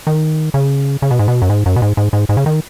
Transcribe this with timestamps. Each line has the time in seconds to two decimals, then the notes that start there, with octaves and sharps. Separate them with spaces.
0.07 D#3
0.54 C#3
1.02 C#3
1.11 B2
1.19 G#2
1.28 B2
1.42 F#2
1.50 G#2
1.66 F#2
1.76 B2
1.82 G#2
1.97 G#2
2.13 G#2
2.29 G#2
2.37 C#3
2.46 D#3